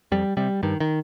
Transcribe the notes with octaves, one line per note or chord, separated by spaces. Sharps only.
F2 G3
C3 G3
G2 D#3
D#3